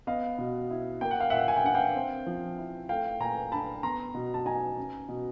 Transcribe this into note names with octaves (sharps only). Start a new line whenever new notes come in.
B3 D#5 F5
B2
E4
A#3 G5
F#5
F5
A#2 E5 F#5
G#5
G5
D4 F#5
F5 G5
C4
F3
E4
A3 F5 G5
A#2 G#5 A#5
D4 A5 B5
B3 A#5 C6
B2
A5
D#4 G#5 A#5
C#4
B2